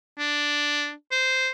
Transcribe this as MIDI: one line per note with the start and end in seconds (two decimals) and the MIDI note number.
0.19 0.92 62
1.11 1.50 72